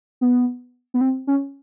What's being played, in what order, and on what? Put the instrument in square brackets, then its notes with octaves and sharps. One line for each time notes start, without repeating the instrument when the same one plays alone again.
[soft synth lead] B3
B3
C4
C#4